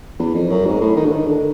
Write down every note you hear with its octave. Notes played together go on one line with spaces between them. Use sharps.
E2
F2
F#2
G#2
A2
D#3
D3
D#3
D3